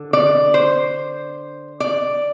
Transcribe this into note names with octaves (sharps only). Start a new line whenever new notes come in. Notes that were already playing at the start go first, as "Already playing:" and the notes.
Already playing: D3
D5
C5
D5